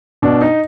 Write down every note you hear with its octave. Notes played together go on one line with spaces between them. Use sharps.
B2 D4
D#4